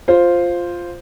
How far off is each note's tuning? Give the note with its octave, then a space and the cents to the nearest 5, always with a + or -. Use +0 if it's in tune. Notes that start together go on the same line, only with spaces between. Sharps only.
F4 +0 C5 +0